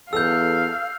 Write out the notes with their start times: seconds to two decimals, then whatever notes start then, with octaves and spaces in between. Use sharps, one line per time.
0.13 E2 A4 F5 E6 F6 G6